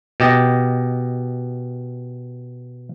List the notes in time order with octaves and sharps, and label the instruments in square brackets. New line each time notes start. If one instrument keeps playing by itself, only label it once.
[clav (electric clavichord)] B2 G4 D#5